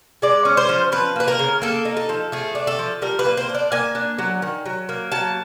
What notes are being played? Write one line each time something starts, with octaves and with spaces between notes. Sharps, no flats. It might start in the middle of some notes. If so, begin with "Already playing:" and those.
G#3 D5
C#4
C5
F3
F3 B4
A#3 B4
A#4
C#3
A#3 A4
D#4
A4
F3
A3 G#4
D4
A4
F3
G3 A#4
B4
A#3
C5
D4
D5
A#3 G#5
D4
F#3
D#3
F#3
A#3
F#3 A5